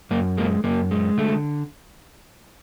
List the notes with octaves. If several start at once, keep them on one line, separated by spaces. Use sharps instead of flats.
F#2 A#3
G#3 A#3
F#2 A#3
G#3
D3 A3